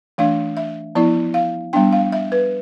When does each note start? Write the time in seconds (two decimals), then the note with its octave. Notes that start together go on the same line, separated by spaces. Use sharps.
0.18 E3 A3 D4 F5
0.57 E5
0.95 F3 B3 E4 D5
1.34 F5
1.73 G3 B3 D4 G5
1.92 F5
2.12 E5
2.32 B4